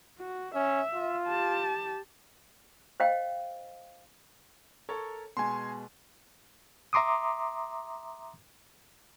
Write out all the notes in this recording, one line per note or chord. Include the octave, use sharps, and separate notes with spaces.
F#4
C#4 E5
F4
G4 A5
C5 D#5 F5 G5
A4 A#4 C#5
B2 G#3 G#5 C6
E5 A#5 C6 D6 D#6